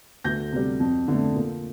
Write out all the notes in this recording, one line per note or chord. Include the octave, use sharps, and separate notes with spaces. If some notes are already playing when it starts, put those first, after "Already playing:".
D2 G6 A#6
C3 G3
F2
D3 A3
A#2